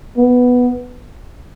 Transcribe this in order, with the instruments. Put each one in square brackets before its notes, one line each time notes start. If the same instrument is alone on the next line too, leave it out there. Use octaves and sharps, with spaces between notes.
[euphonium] B3